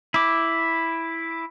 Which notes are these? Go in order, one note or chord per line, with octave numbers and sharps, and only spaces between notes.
E4 D6